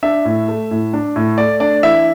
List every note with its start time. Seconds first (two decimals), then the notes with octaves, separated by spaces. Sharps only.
0.03 D4 E5
0.25 A2
0.48 A3
0.71 A2
0.93 D4
1.16 A2
1.38 A3 D5
1.60 D4 D5
1.83 E3 E5